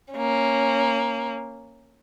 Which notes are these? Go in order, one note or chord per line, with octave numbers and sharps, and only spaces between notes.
A#3 C#4